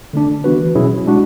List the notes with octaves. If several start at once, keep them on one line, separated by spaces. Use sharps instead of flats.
D3 A3 D4
E3 B3 D4 F#4 B4
B2 F#3 C#4 E4 G#4
G#3 D4 F#4